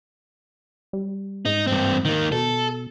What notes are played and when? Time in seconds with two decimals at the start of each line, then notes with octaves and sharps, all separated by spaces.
0.93 G3
1.45 G#2 D#4
1.67 G2 C4
2.05 D#3 A#3
2.32 B2 A4